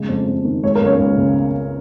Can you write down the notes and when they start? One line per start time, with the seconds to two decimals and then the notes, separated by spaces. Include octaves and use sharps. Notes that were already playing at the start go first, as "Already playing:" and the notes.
Already playing: C#3 G#3
0.09 F2
0.27 F2
0.44 D#3
0.63 G#3 C#5
0.75 A#4
0.81 C#2
0.86 C#5
0.99 C#2
1.17 C#3